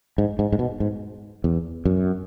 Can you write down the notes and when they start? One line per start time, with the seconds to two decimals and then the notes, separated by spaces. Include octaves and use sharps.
0.18 G#2
0.39 G#2
0.52 G#2
0.59 B2
0.80 G#2
1.44 E2
1.85 F#2